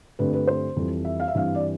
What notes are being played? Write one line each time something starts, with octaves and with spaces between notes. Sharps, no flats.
G2 D3 A3 C4 B4
B4
C5
F2 E3 G3
E5
F5
E5
G2 E3 G3 C4 F5
D5